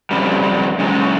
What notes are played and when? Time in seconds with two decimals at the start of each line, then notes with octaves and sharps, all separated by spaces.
0.11 F2 C#3 G3
0.79 F#2 C#3 G#3